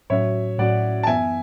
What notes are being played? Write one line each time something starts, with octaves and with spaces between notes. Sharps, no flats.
A2 F#3 C#4 F#4 C#5 E5
A2 F#3 C#4 F#4 D5 F#5
A5
F#2 E3 B3 E5 G#5